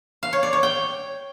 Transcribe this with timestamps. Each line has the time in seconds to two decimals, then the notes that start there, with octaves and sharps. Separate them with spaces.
0.23 F5
0.33 C#5
0.43 D5
0.53 C#5
0.63 G5